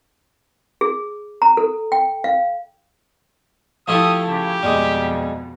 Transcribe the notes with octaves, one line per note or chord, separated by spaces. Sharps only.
G#4
A#5
A4
G5
F5
F3 A3 E4 G4 A4 D#6
C#3 G4
F2 B2 G3 G#3